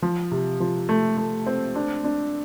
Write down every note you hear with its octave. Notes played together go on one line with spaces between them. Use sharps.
F3
C3
F3
A3
A3
C4
D4
D4